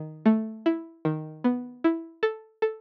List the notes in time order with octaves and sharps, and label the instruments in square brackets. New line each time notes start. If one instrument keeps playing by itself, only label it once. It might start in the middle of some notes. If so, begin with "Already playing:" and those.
Already playing: [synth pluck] D#3
A3
E4
D#3
B3
E4
A4
A4